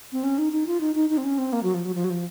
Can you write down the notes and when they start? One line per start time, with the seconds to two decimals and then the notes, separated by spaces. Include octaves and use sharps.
0.12 C4
0.24 C#4
0.38 D#4
0.52 D#4
0.67 F4
0.81 D#4
0.95 D#4
1.10 D#4
1.17 C4
1.24 C#4
1.38 C4
1.53 A#3
1.63 F#3
1.74 F3
1.85 F#3
1.95 F3
2.04 F#3
2.10 F3